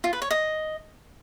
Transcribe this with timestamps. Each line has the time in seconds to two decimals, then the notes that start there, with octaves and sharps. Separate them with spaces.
0.04 F4
0.13 B4
0.22 C#5
0.31 D#5